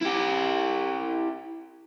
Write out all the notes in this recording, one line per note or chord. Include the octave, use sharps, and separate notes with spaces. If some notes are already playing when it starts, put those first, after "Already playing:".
E4 G4